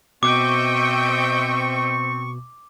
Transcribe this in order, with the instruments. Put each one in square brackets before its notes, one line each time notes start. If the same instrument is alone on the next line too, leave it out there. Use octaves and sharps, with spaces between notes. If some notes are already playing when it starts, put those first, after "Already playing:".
[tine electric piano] B2 [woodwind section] C4 C#6 [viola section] D#5 E5 G5 [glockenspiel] D6